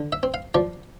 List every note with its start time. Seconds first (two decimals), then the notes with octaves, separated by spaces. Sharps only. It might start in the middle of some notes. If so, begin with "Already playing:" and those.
Already playing: D3
0.12 E5
0.23 C4
0.34 F5
0.55 F3 D5